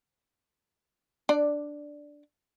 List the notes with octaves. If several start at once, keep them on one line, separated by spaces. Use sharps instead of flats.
D4 D5